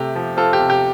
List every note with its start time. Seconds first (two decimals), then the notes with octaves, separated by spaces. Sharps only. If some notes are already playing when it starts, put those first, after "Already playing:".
Already playing: C3 A3 G4
0.15 F3
0.37 C4 F4 A4
0.53 G4
0.59 C3
0.70 G4